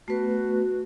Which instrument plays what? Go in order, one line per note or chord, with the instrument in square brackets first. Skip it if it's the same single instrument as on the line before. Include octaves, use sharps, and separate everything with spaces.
[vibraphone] A3 B3 B4 [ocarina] F#4